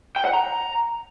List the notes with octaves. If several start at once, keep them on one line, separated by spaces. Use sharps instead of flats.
G5
F#5
A#5